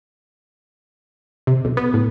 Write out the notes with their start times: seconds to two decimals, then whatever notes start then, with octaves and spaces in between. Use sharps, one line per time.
1.47 C3
1.65 B1
1.77 B3
1.94 A2